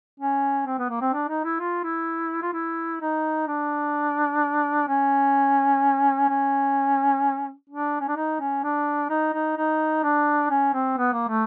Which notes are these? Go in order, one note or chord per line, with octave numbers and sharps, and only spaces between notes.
C#4
C4
B3
A#3
C4
D4
D#4
E4
F4
E4
F4
E4
D#4
D4
C#4
C#4
D4
C#4
D4
D#4
C#4
D4
D#4
D#4
D#4
D4
C#4
C4
B3
A#3
A3